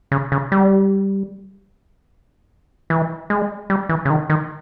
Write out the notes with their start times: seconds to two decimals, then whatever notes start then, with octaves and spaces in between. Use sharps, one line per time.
0.12 C#3
0.32 C#3
0.52 G3
2.90 E3
3.30 G#3
3.70 G3
3.89 E3
4.05 C#3
4.10 D#3
4.30 D#3